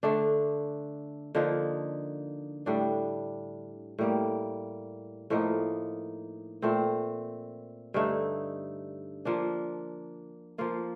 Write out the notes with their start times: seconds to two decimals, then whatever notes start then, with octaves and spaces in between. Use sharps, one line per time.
0.03 D3 A3 D4
1.35 D3 F3 A#3 D#4
2.66 A2 G3 D4
3.99 A2 G3 A#3
5.30 A2 F3 A#3 D#4
6.62 A#2 A3 C4
7.94 G2 D3 A3 D#4
9.25 F3 A#3 D4
10.58 F3 A#3 F4